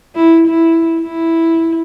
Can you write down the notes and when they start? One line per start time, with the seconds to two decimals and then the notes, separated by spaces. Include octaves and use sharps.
0.15 E4
0.47 E4
1.02 E4